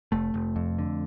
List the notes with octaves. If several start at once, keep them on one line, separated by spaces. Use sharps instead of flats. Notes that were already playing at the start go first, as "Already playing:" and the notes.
F1 A3
F1
F2
D3